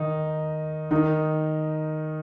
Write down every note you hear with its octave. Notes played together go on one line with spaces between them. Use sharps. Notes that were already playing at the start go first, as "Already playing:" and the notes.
Already playing: D#3 D#4
D#3 D#4